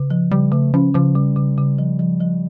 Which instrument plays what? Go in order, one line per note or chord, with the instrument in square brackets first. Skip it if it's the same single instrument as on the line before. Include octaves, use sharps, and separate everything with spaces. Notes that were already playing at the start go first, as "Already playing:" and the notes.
Already playing: [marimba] C#3
F3
[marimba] C#3 [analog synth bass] G3
[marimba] C#3 [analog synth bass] A3
[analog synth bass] F3 [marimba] C#4
[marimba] C#3 [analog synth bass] F3
[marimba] C#3 [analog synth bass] G3
[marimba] C#3
C#3
F3
F3
F3